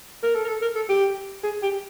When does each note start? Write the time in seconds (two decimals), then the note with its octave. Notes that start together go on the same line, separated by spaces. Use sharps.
0.23 A#4
0.35 A4
0.44 A#4
0.48 A4
0.62 A#4
0.76 A4
0.89 G4
1.44 G#4
1.63 G4